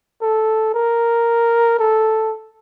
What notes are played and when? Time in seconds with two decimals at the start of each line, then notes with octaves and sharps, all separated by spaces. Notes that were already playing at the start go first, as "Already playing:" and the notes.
0.22 A4
0.74 A#4
1.79 A4